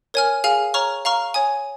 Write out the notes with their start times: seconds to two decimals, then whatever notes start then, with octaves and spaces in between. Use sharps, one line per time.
0.14 A#4 C#5 G#5 F6
0.44 G#4 F5 G#5 F6
0.74 C#5 A#5 C#6 F6
1.05 F5 A#5 C#6 F6
1.34 C#5 G#5 D#6